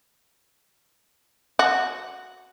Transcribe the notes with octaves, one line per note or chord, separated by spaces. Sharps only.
F#4